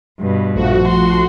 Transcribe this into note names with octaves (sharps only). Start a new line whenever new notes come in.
G2 B2
A#1 F3 A3 F#4
C6